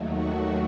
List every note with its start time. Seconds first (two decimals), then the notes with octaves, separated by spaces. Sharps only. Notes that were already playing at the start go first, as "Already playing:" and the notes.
Already playing: D#2 D#3 F#3 A3
0.14 F#4